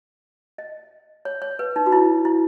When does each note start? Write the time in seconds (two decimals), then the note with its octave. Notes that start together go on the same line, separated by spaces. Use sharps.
0.58 D#5
1.25 C#5
1.42 C#5
1.59 B4
1.76 D#4
1.86 F#4
1.92 E4
2.25 E4